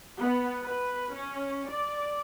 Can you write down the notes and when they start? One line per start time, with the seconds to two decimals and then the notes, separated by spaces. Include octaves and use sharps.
0.20 B3
0.64 B4
1.14 C#4
1.70 D5